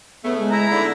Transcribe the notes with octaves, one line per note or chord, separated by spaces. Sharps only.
G#2 C#3 A3 B3
G#3
E4 A#5
G#2 D3 B5